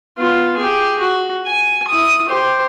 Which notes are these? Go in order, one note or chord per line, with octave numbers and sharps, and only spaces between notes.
B3 F4
G4 G#4
F#4
G#5
E4 D#6
G4 C5